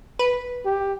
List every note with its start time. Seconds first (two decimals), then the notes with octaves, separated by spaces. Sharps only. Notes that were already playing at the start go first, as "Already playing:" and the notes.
0.19 B4
0.65 G4